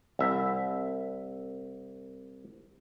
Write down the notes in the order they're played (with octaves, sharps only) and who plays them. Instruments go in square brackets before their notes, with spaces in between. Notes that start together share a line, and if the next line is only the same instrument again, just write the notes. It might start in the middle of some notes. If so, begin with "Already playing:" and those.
[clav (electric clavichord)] C2 E5